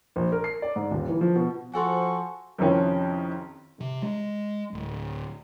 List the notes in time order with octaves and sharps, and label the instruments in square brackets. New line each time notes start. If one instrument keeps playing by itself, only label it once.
[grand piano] A#1
A#4
C7
D5
G#2
D#1
E3
F3
B2
[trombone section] F3 [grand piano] F#4 A4 F#5 [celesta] G#5 C6 [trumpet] C#6
[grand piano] F2 C3 D#3 F3 C#4 E4
[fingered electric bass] C3
G#3
D1